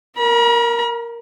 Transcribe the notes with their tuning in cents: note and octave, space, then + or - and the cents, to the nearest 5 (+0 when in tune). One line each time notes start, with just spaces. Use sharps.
A#4 +0 B5 -45